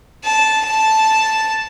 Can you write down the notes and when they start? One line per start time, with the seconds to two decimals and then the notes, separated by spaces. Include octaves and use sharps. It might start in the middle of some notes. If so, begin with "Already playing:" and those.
0.24 A5
0.66 A5